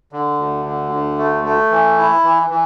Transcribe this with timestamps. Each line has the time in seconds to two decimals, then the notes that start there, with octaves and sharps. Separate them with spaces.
0.12 D3
0.38 D2
0.65 D3
0.92 D2
1.18 A3
1.45 A3
1.71 E3
1.97 E4
2.24 E3
2.50 E3